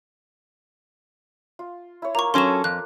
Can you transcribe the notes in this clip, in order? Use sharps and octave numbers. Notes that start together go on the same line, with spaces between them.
F4
E4 C#5
A#3 F4 A#5 C#6
F#3 C#4 A4 C6 E7
F2 F#6